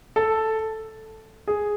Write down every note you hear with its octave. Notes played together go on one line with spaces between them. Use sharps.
A4
G#4